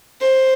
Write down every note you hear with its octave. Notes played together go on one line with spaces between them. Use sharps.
C5